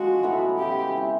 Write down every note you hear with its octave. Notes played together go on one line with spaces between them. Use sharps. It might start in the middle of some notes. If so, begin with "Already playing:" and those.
Already playing: F3 G#3 C#4 F#4
A2 F#3 B3 E4
C#3 E3 G#3 G4
E3 G#3 C4